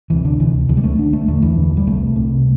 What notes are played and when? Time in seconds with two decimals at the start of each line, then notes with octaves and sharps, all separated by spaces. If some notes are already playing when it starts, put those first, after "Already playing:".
0.10 D2 C3 E3
0.25 D3
0.40 D2 C3 E3
0.69 D2 D3 E3
0.77 G3
0.84 A3
0.98 D2 D3 D4
1.13 A3
1.28 E2 D3 A3
1.42 E3
1.57 E2 D3
1.77 G3
1.86 C2 C3 A3
2.16 C2 C3